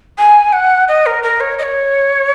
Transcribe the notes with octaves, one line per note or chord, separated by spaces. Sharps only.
G#5
F#5
D#5
A#4
A#4
C#5
D#5
C#5